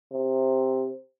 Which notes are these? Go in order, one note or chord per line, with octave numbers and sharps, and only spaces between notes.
C3